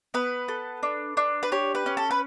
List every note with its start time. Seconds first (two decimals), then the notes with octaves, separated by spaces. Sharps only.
0.14 B3 B4
0.48 A4
0.83 D4
1.17 D4
1.43 B4
1.52 G4 C#5
1.75 B4
1.86 C#4
1.97 A4
2.11 B4